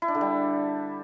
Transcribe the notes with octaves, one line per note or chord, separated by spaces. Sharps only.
E4
D4
D3
G3